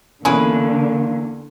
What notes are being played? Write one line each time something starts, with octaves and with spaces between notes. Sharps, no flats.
E2 D3 A#3 C#4 E4 G#4 B4